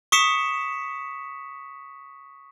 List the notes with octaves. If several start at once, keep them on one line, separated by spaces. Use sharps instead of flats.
C#6 D#6 B6 C#7 E7